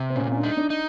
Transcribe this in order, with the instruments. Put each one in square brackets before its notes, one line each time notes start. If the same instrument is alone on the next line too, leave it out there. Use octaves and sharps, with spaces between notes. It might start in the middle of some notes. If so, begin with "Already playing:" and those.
Already playing: [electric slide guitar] C3
[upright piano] C4
[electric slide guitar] A#2 [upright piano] C#4
[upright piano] C#4
D4
[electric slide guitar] D#4
[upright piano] D4
[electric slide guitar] D#4